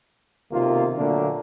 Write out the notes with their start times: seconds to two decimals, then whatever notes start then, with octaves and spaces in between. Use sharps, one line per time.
0.52 B1 C3 D#3 A#3 F4
0.97 A#2 D3 F#3 A3 A#3 D4